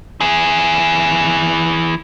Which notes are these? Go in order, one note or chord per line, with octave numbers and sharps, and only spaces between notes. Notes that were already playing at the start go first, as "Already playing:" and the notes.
E3 G#4